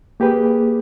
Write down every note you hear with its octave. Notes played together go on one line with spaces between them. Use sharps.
A#3 G4 G#4 B4